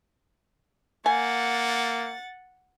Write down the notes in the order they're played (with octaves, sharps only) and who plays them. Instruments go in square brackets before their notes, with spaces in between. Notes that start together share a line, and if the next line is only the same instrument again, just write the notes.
[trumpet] A#3 [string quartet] F#5 A6 [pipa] G#5